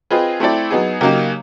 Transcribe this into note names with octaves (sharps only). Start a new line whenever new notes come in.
C4 F4 G#4 B4 D#5
A3 C4 E4 A4 D5
F#3 B3 D#4 G#4
C#3 F#3 A#3 D#4 G4